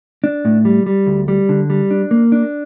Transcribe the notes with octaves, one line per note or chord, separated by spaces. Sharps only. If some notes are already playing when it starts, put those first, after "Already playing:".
D4
A2
G3
G3
D2
G3
D3
G3
D4
A#3
D4